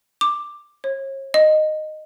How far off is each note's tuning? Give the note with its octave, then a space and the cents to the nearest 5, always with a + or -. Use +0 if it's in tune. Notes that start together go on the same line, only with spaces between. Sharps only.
D6 +10
C#5 -40
D#5 -10